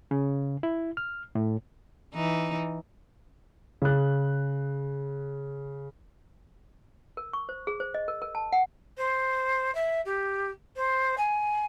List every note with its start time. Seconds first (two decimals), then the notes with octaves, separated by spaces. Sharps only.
0.11 C#3
0.63 E4
0.97 F6
1.35 A2
2.15 E3 D#4
3.82 C#3 F#6
7.17 A#4
7.33 C#6
7.49 C5
7.67 G#4
7.80 C5
7.94 D#5
8.08 A#4
8.22 A#4
8.35 A5
8.53 F#5
8.97 C5
9.74 E5
10.05 G4
10.76 C5
11.17 G#5